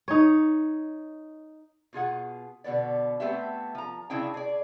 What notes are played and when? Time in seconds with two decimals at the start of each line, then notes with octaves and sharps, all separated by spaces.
0.08 D#4 C#5
1.93 B2 F4 G#4 F#5
2.64 B2 D3 B3 D5
3.20 A3 B3 C4 G4 E5
3.75 F3 A#5
4.10 C#3 C4 D4 E4 G#4 G5
4.34 G#4 D5